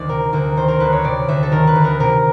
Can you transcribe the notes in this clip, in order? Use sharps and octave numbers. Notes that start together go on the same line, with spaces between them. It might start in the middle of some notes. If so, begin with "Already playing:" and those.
Already playing: D2 D#3 D5
C3 A#4
D2 A#4
D#3 C5
A#4
D2 B4
C#5
C3 D5
D2 E5
A4
D#3 A#4
B4
D2
A#4
C3 A#4